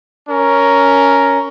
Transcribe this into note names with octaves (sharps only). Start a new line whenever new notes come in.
C#4 A#4